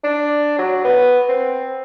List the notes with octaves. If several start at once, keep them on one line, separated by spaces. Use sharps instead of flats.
D4
F#3
B3
C4